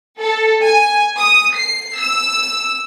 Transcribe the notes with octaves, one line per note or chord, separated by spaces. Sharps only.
A4
G#5
D#6
C7
E6